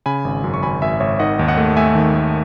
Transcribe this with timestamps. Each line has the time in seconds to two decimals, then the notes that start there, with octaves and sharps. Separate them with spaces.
0.06 C#3 G#5 B5
0.25 G#1
0.44 F#2
0.54 C#6
0.63 G#1 G#5 B5
0.82 G#1 E5 G#5
1.00 G#1 C#5 E5
1.19 D#3 D#5 F#5
1.39 D#2
1.48 D#5 F#5
1.57 A3
1.77 A3 E5 G#5
1.95 D#3
2.15 A3